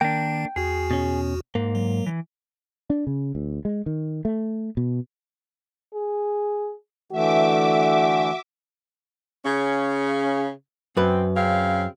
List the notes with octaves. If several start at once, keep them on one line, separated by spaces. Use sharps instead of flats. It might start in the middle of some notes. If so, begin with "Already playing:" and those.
D#3 A#3 D4 G5
E2 F#4 G#4
B2 C#4
G#2 A#3
F#3
E3
D4
C#3
D2
G#3
D#3
A3
B2
G#4
D3 E3 A3 F#4 E5 D6
C#3 C#4
F#2 C4 B4
C#3 C4 F5